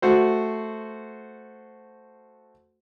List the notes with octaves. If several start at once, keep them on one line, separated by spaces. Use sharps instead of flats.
A3 F#4 C5